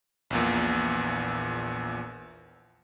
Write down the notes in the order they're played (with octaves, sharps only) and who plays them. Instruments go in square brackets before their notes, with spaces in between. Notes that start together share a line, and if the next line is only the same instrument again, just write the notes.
[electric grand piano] A#1 E2 A#2